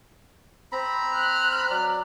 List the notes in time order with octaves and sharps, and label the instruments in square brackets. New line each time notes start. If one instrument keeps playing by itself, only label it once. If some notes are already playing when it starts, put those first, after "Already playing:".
[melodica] C4 A#5 B5
[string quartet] F6 F#6
[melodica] F#3 D5